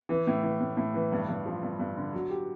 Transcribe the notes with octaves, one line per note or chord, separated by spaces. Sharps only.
E3
A2
E3
A2
A2
E3
G2
G2
F3
G2
G2
D3
F#3
G4